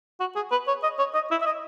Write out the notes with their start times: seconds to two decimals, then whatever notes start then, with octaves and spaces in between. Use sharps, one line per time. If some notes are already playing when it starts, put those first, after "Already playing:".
0.20 F#4
0.36 G#4
0.51 B4
0.68 C#5
0.83 D#5
0.99 C#5
1.15 D#5
1.31 E4
1.41 E5
1.46 D#5